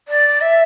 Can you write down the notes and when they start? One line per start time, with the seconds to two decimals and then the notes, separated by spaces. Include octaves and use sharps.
0.08 D5
0.41 E5